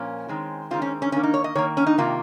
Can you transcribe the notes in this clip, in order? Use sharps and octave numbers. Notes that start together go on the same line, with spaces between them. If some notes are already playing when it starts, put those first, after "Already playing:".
Already playing: A#2 F3 A#3 C#4
D#3 G#3 C4
D#3 G#3 C4 F4
C#4
C#4
D#3 A#3 C#4
D#4
C#5
D#5
D#3 A#3 C#5
C#4
D#4
C3 D#3 A#3 F4